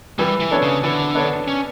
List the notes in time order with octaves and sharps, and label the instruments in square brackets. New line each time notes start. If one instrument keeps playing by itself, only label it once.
[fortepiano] E3 [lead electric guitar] G3
[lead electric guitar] E3
[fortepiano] B3 D4 A4 C#5
[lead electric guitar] C#3
[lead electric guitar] D3 [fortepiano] E3
[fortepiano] B3 D4 A4 C#5
[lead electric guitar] C#4